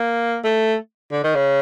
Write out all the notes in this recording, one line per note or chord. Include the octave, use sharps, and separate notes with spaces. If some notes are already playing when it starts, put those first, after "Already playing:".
Already playing: A#3
A3
D3
D#3
C#3